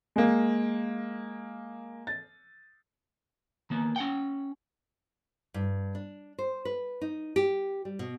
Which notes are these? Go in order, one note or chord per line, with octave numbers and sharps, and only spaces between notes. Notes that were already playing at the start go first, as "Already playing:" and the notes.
G#3 A#3
A6
D#3 A#3 B3
C#4 F#5 G5
G2
D4
C5
B4
D#4
G4
G3
B2